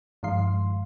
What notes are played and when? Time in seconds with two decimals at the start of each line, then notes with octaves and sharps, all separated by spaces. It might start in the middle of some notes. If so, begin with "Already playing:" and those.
0.23 G2 D#3 F3 G#3 F5 C6